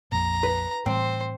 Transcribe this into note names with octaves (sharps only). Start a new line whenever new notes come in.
A#1 F2 A#2 A#5
B4
A2 E3 G3 C4 C5